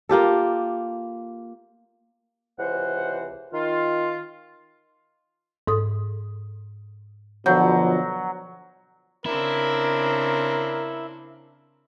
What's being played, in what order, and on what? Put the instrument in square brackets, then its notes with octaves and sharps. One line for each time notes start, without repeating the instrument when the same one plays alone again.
[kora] A#3 F4 G4 A4
[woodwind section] C#2 C3 E3 C5 F#5
D#3 F4
[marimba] G#2 A4 D#6
[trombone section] B2 D3 F3 [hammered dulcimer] F#3 [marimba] G6
[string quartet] C#3 C4 D4 [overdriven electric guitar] E4 [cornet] A#4